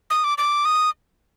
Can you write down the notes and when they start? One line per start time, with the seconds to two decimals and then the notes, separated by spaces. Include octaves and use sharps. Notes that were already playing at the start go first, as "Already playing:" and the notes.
0.10 D#6
0.24 D6
0.38 D6
0.65 D#6